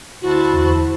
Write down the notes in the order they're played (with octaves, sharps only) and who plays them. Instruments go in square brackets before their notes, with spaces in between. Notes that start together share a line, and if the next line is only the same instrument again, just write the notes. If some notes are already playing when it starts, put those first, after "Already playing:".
[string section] D2 C5 A5 [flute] E4 [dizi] F#4
[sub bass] E2